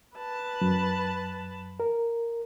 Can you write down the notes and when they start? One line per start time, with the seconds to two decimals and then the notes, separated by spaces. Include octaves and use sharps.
0.17 B4 A5
0.61 F#2
1.80 A#4